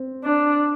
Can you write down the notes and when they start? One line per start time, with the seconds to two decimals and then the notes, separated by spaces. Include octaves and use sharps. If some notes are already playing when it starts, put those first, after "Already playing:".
Already playing: C4
0.24 D4